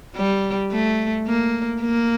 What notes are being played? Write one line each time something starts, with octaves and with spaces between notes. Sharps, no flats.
G3
A3
A#3
A#3